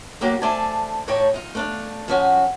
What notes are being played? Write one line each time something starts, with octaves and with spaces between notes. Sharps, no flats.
D3 F#3 A#3 G4
A3 C5 D5 G#5 A5
A2 D#4 C#5 D5 G5 A5
D#4 F4
A3 D4 F5
F3 C#4 F#4